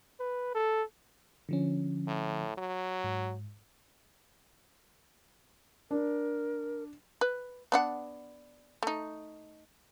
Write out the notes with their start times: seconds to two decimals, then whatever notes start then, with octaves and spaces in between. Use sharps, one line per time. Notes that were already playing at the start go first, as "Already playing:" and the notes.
0.20 B4
0.55 A4
1.49 D3 F3 C#4
2.08 A2
2.58 F#3
3.04 G#2
5.91 D4 A#4
7.21 B4
7.72 B3 D4 F#5
8.83 A3 D#4